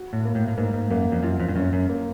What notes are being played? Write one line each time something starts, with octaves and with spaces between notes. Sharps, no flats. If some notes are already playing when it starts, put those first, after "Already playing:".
Already playing: F#4
A2
A#3
A2
A2
G#2 A#3
G#2
F#2 A#3
F2
F#2 F4
F2
G2
F#2 C#4
F#2
A#3